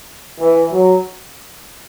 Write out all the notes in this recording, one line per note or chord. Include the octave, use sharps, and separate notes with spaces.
E3
F#3